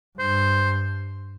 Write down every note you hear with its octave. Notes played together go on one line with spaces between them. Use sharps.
G2 C5